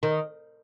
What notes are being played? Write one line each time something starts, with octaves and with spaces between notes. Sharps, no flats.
D#3